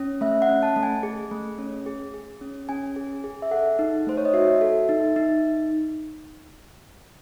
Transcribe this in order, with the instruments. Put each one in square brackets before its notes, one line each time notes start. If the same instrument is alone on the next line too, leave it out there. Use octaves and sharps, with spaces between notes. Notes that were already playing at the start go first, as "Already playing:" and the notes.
Already playing: [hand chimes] C#4
A3 E5
F#5
C#4
A5
A3
G#5
G#4
A3
C#4
G#4
G#4
C#4
C#4 G#5
G#4
G#4
E5
A4 F#5
D#4
A3 C5
C#5
D#5
F#4 E5
A4
D#4
D#4